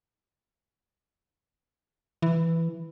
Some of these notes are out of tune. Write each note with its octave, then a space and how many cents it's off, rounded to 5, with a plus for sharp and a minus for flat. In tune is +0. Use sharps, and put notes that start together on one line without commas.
E3 +5